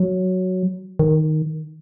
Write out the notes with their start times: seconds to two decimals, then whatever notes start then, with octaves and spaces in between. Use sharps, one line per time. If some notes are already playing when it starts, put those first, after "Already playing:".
Already playing: F#3
0.99 D#3